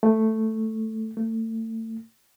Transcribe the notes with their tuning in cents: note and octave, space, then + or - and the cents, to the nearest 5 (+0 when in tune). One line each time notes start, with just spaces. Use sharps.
A3 +5
A3 +35